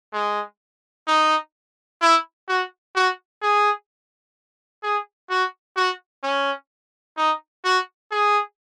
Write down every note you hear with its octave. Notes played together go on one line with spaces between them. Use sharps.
G#3
D#4
E4
F#4
F#4
G#4
G#4
F#4
F#4
C#4
D#4
F#4
G#4